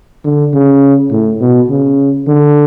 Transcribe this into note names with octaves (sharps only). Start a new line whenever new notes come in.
D3
C#3
A2
B2
C#3
D3